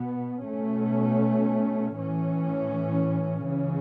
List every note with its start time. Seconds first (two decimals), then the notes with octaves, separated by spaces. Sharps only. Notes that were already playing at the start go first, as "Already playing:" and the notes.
Already playing: B2 B3
0.47 B2 A3 C#4
1.96 A2 E3 C#4
3.46 C#2 C#3 E3 C#4